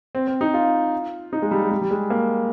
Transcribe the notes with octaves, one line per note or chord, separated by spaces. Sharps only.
C4
C4
D#4
F4
D#4
G#3
G3
G#3
G3
G3
G#3
A#3